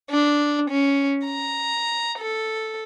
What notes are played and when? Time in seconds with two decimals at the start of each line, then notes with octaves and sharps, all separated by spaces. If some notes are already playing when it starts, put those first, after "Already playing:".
0.10 D4
0.70 C#4
1.26 A#5
2.19 A4